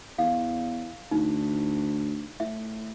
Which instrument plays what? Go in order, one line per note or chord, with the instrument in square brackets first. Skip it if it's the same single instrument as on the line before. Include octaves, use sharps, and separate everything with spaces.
[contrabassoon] E2 [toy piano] F5
[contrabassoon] D2 [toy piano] D#4
[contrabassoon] A2 [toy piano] E5